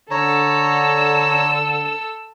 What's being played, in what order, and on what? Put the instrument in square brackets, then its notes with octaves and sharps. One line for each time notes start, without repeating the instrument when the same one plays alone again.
[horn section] D3 [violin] A4 E6 [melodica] C#5 A#5